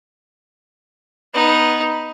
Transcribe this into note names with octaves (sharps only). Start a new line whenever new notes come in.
B3 D#4